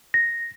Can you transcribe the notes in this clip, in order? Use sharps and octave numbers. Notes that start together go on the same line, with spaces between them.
A#6